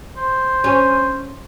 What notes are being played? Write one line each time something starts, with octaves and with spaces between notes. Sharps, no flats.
C5
C#4